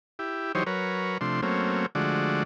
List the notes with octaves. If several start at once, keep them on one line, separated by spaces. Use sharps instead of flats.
E4 G4
E3 F#3 D#4 G4 C5 C#5
F#3 A#4 B4 C#5
C3 F3 A3 D4 C6
F#3 A3 A#3 C4 C#4
D3 F3 G#3 A3 F#4 D5